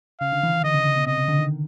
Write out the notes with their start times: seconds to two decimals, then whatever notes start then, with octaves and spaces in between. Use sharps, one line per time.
0.21 C#3 F5
0.32 D3
0.43 E3
0.54 D#3
0.64 D3 D#5
0.74 C#3
0.85 C#3
0.96 B2
1.06 C3 D#5
1.18 C#3
1.28 D3
1.39 D#3